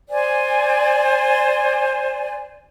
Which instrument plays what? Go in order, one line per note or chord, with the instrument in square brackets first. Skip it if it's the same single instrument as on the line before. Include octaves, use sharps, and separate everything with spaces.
[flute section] C5 D5 G#5